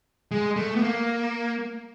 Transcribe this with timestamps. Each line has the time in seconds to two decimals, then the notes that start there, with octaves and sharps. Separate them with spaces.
0.31 G#3
0.56 A3
0.75 B3
0.82 A#3